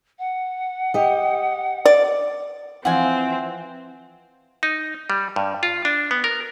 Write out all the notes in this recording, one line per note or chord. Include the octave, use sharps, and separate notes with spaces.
F#5
G4 D#5
D5
E3 F3 C4 F#5 G#5
D#4
G3
G2
F4
D4
B3
A#4